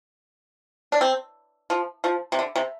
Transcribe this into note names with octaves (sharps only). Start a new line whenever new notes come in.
D4
C4
F3
F3
C3
D3
C3